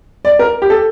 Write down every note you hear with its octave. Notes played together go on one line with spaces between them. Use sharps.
D5
A#4
G4
A4